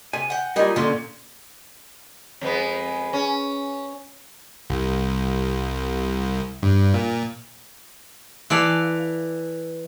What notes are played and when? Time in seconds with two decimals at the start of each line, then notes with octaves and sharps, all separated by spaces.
0.13 C3 G#5
0.30 F#5 G5
0.56 G3 A#3 D#4 F4 G#5
0.76 A#2 D3 C#4 C6
2.41 F2 G#3 B3
3.13 C#4
4.70 C2
6.63 G2
6.94 A#2
8.50 E3 A4 D5 F5